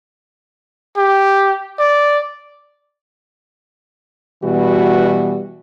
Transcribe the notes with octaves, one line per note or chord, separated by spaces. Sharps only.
G4
D5
B2 E3 G3 F#4